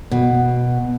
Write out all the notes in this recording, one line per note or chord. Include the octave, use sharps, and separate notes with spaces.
B2